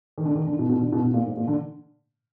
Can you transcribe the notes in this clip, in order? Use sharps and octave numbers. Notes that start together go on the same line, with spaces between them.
D#3
D3
D#3
D3
B2
B2
D3
B2
B2
A#2
G#2
A#2
D3